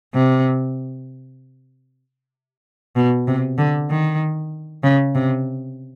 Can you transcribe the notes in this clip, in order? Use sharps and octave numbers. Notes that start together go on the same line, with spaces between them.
C3
B2
C3
D3
D#3
C#3
C3